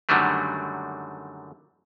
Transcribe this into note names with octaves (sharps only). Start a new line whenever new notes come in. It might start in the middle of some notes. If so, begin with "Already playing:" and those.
F#2 D3 D#3 F#3 G3 A3